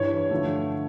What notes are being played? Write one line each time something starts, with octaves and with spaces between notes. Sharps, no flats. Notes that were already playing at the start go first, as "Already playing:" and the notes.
Already playing: G2 E3 G3 C#5
D3 F3 A3